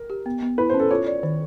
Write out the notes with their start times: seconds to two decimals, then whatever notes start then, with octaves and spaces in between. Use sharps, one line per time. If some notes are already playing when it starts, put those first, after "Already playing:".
Already playing: A#4
0.10 G4
0.26 B3
0.42 B3
0.58 E4 B4
0.70 C5
0.74 C#4
0.80 A4
0.91 F4 C#5
1.07 D5
1.23 D#3